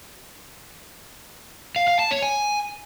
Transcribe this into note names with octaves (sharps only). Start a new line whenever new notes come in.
F5
F5
A5
C#5
G#5